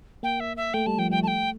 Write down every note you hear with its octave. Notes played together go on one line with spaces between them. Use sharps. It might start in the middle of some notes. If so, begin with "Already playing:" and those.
A#3 G5
E5
E5
A3 G5
G3 A5
F3 G5
G3 G5
A3 G5 A5